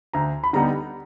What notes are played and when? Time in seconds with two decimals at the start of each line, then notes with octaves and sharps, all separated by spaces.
0.13 D2 A#5
0.44 B5
0.53 D3 G3 B3 D#4 A#5